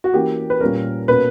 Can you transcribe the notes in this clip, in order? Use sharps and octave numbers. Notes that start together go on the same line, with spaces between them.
F#4
E3 A#3 C#4 G4
B4
A#2 G3 C#4 A#4
B2 A#3 C#4 B4